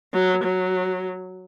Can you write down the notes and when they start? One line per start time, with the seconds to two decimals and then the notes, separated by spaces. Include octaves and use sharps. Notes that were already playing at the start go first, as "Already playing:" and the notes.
0.14 F#3
0.44 F#3